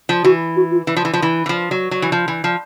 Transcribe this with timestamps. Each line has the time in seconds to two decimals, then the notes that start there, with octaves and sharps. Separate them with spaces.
0.09 F3
0.24 E3 F#4
0.56 F#4
0.72 F4
0.87 E3
0.96 F3
1.05 E3
1.13 F3
1.22 E3
1.46 E3
1.49 F3
1.71 F#3
1.91 F#3
2.02 E3
2.12 F3
2.28 E3
2.44 F3